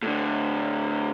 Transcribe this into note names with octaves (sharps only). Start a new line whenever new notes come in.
A2 D3